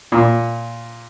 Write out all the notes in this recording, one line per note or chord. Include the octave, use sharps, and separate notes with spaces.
A#2